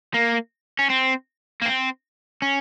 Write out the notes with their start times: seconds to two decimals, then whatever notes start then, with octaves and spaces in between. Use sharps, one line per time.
0.14 A#3
0.79 C#4
0.90 C4
1.62 A#3
1.66 C4
2.42 C#4